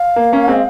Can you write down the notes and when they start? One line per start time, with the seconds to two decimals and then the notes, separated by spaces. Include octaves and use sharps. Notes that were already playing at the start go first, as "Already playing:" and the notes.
Already playing: F5
0.16 A#3
0.32 A#3 C#4
0.48 G#3 C4